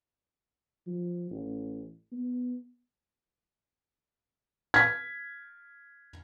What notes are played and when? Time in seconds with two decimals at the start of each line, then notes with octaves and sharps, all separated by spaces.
0.87 F3
1.31 A1
2.12 B3
4.74 G#6 B6